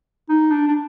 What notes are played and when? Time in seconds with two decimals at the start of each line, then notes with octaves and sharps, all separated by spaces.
0.29 D#4
0.51 D4
0.68 D4